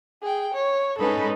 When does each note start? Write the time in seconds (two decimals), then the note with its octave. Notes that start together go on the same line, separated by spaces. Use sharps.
0.23 G#4 G5
0.54 C#5
0.98 G#3 C#4 D#4 A4 B4